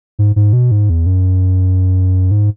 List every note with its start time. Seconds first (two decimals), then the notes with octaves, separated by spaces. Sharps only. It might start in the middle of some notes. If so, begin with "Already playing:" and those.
0.19 G#2
0.36 G#2
0.53 B2
0.71 G#2
0.90 E2
1.06 F#2
2.31 G#2